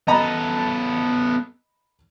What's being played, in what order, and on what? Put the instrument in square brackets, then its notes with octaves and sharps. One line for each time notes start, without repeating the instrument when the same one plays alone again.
[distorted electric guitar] B3 A4 [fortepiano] D#5 A#5 B5